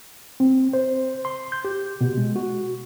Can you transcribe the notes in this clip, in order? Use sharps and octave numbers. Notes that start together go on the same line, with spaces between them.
C4
C5
C6
G6
G4
B2
G#3
F#4